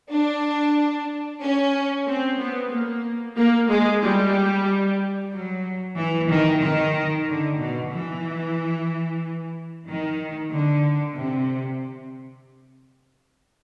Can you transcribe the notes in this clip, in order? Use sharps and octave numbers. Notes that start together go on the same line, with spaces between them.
D4
C#4
C4
B3
A#3
A#3
G#3
G3
F#3
E3
D#3
D#3
D3
B2
E3
D#3
D3
C3